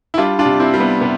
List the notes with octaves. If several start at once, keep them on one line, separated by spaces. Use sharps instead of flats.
E4
G3 D4 F4
D4 F4
C3
C4 E4
G3
B3
C3 B3